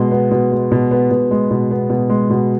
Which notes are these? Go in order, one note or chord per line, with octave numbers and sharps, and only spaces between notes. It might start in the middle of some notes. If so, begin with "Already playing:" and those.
Already playing: B2 G#3
B3
B2
G#3
B2
B3
B2
G#3
B2
B3
B2
G#3
B2